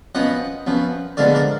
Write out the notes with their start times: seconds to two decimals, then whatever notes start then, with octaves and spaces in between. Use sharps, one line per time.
0.15 F#2 F3 B3 D#5 F#5
0.67 F#2 F3 B3
1.17 D3 F3 G#3 B3 D5 F5
1.35 A#4 D5